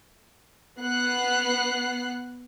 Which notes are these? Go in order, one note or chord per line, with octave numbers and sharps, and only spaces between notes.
B3 F#5 F#6 C7